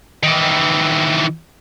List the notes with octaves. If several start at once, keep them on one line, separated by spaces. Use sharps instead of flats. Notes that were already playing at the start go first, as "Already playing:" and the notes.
D#3 E3